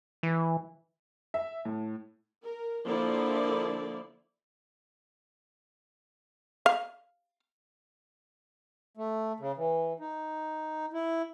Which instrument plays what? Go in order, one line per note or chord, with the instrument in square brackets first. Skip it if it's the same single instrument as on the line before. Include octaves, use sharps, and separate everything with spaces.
[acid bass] E3
[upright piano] E5
A2
[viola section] A#4
D3 F3 A#3 E4 D5
[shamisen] F5
[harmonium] A3
C#3
E3
D#4
E4